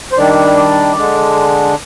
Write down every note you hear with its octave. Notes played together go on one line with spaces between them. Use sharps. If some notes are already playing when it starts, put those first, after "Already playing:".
C5
D#3 G3 D4 D5
D5
D3 G#3 D4